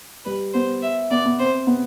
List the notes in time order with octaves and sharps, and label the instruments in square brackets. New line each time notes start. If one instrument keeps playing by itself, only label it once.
[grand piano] G3 [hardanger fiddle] B4
[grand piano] B3 [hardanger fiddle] C5
[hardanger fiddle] E5
[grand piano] B3 [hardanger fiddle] D5
[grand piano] B3
[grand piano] C4 [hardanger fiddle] C5
[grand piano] B3